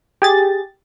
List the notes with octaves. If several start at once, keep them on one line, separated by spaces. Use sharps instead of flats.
G4 G#4 A6